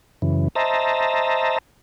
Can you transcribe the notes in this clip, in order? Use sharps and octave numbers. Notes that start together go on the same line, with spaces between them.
F#2 C#3 E3
C5 D#5 E5 A5 A#5